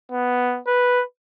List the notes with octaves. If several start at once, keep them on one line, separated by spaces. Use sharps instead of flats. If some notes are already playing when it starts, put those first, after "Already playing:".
B3
B4